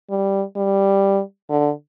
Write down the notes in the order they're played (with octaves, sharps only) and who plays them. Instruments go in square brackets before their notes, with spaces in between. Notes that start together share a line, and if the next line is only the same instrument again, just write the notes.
[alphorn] G3
G3
D3